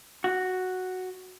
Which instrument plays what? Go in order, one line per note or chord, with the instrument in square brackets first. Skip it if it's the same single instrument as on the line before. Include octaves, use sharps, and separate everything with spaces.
[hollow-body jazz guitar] F#4